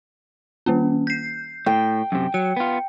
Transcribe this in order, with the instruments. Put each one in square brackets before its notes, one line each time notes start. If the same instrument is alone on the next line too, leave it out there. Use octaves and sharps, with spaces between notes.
[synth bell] D#3 A#3 C#4
G6 C7
[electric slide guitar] A2 [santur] G5
[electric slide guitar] F#2 C3
[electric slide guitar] F#3 [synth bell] C#7
[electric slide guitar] B3 F4